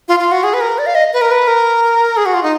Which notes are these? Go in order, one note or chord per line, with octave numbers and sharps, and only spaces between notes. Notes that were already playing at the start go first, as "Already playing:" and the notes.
F4
F4
F#4
G#4
B4
A#4
D5
F5
D#5
B4
A#4
B4
A#4
G#4
F#4
F4
D#4